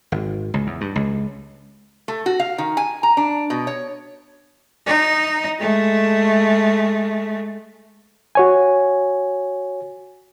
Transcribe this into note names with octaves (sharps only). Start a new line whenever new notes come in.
G#1
C#2
E2
G2
C#2
A3
F#4
F5
D#3
G#5
A#5
D4
B2
C#5
D#4
G#3 A3
F#4 C#5 G#5